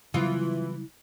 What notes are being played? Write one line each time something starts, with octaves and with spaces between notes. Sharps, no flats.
C#3 E3 F#3 G3 B3 E4 F4